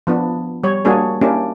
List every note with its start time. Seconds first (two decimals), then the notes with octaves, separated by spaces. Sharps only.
0.07 F3 B3 D4
0.64 G3 C#5
0.85 G3 A#3 D4 F#4 G#4 C#5
1.21 A#3 C#4 D4 E4 G4